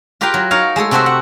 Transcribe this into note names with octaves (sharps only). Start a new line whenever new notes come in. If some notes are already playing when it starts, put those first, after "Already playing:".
F4 G4 A#4 B4 F5 G5
F#3
D#4 A#4 C#5 F5
G#3 A3 G#4 A4
C3 C4 F#4 A4 C5 E5
F#5